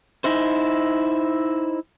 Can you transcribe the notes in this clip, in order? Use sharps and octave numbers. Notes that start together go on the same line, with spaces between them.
D#4 E4 C5